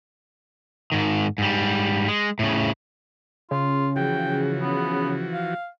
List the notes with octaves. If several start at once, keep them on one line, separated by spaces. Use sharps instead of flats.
G#2 D#3
G#2 G3
G#3
A2 C#3
C#3 F4
E3 F3 F#4 G5
B3
F5